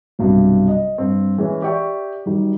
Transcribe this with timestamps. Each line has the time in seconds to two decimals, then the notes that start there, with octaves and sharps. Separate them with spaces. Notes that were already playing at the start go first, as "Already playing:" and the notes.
0.19 B1 G2 C3
0.68 D#5
0.98 G2 C4
1.38 E3 G#3 C#4
1.62 G4 D5 E5 G5 C#6
2.26 F#2 D#3 G3